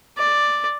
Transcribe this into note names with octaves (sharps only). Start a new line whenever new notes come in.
D5